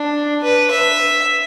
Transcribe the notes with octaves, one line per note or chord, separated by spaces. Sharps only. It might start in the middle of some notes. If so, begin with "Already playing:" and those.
Already playing: D4
B4
E5